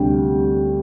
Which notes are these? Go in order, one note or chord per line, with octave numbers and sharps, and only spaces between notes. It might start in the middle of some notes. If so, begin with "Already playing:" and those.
Already playing: D2 C3 G3 G5